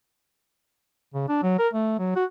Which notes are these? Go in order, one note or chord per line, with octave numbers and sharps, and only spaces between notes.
C#3
D4
F#3
A#4
A3
F#3
F#4